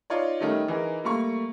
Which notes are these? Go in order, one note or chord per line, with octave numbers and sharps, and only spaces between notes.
D#4 F4 C#5 D5
D#3 G3 A3 C#4 D#4
E3 D#4 G#4 A#4
G3 A3 A#3 C#6